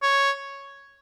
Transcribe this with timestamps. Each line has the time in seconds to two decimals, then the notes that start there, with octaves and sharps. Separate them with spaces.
0.02 C#5